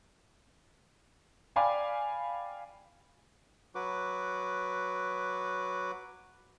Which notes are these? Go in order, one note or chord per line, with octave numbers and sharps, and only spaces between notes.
D5 F5 G5 G#5 B5 D6
F#3 F#4 B4 D6